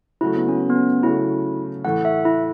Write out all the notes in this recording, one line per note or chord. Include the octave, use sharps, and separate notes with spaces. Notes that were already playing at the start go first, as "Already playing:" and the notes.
C#3 F#3 A3 E4
B3
C#4
B3
C#4
C#3 F#3 A3 E4
A2 E3 A3 F#5
E5
E4